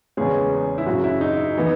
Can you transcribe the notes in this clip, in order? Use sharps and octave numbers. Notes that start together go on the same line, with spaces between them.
E2 C#3 E3 G#3 C#4 G#4
E4
F#2 C#3 F#3 F#4
E4
D#4
E3 B3